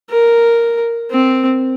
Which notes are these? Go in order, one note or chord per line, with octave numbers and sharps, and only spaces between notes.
A#4
C4